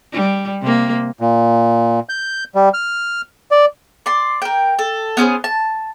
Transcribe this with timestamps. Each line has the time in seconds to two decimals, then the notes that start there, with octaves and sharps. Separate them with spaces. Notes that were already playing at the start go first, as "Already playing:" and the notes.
0.12 G3
0.62 C3 A#3
1.21 A#2
2.09 G6
2.55 G3
2.74 F6
3.51 D5
4.06 D5 C6
4.42 A#4 G5
4.79 A4
5.17 B3 C#4 G#4 C5
5.44 A5